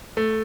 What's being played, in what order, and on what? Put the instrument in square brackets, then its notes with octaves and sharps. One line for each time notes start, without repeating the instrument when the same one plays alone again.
[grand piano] A3